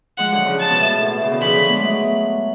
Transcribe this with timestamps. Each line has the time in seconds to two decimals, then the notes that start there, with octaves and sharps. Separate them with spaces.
0.18 F3 G#3 F#5
0.32 D3 F#3
0.46 C#3 F3
0.60 C#3 A5
0.69 B2
0.80 A2
0.90 B2
1.00 A2
1.10 B2
1.22 C#3
1.31 B2 D3
1.41 C#3 F3 B5
1.55 D3 F#3
1.69 G#3 B3
1.83 F#3 A3